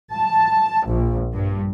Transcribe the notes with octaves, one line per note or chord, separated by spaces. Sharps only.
A5
A#1
G2